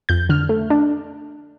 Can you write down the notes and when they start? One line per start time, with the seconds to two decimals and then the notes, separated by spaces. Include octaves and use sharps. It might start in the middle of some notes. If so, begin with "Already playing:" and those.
0.09 F2 G6
0.29 D3 F6
0.49 A3
0.70 D4